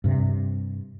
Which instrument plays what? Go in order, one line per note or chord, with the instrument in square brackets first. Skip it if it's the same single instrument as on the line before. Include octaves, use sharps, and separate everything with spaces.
[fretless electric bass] G2 C3